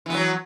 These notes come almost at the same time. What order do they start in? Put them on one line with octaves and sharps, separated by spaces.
E3 B3 F#3